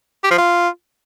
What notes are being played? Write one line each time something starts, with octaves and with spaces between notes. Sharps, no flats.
G4
F3
F4